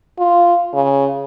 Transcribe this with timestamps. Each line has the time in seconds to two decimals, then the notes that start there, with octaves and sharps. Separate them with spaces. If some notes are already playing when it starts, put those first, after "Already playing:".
0.19 F4
0.74 C#3